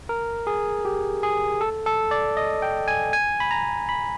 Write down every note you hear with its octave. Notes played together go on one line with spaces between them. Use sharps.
A#4
G#4
G4
G#4
A4
A4
D5
D#5
G5
G#5
G#5
B5
A#5
B5